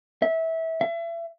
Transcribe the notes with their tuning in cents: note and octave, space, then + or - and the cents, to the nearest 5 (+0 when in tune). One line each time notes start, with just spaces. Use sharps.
E5 -20
E5 +35